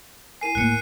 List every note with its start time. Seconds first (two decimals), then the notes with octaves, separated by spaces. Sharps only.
0.41 E4 A#4 G#5 C7 D#7
0.55 D1 A2 A#3 F#6 C#7